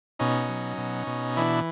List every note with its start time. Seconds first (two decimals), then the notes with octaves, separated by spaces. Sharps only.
0.19 B2 C#4 D#4
0.49 F#3
0.78 B2
1.07 B2
1.37 E3 D4 E4